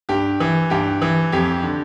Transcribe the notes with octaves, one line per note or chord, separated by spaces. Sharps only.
G2 G4
E3
G2 G4
E3
F2 G4
D3